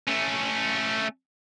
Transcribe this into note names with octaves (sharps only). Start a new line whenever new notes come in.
A3 C#4